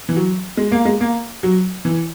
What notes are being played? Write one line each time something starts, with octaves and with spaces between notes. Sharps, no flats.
E3
F#3
G#3
A#3
G#3
A#3
F#3
E3